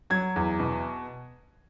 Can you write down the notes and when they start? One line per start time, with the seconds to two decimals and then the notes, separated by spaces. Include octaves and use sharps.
0.10 F#3 G#6
0.36 E2
0.60 B2